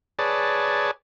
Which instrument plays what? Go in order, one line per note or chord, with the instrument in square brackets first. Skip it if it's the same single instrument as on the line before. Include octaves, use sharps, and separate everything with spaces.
[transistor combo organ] G#4 B4 C#5 D5 A5